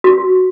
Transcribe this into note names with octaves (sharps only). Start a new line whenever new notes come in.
F#4